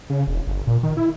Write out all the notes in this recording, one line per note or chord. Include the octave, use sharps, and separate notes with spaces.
C#3
E1
G1
A#2
D#3
E4